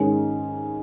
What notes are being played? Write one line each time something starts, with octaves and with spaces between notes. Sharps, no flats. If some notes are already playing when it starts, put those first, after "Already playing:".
Already playing: G#2 D#3 G#3 C#4